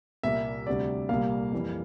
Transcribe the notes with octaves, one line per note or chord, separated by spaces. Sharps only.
C2 A#2 G3 A#3 E5
D2 C3 G3 D5
C2 A#2 G3 A#3 F5
F2 E3 G3 A#3